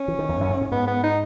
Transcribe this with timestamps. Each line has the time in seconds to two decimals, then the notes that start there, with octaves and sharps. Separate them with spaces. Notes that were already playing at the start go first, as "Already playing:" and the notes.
Already playing: C#4
0.08 E3
0.19 D#3
0.29 E2
0.40 F#2
0.50 G#2
0.61 G#2
0.71 G#2 B3
0.87 B3
1.03 D#4